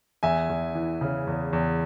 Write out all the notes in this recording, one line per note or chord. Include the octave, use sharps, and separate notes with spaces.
E2 E5 G#5
E2
E3
C#3
E2
E2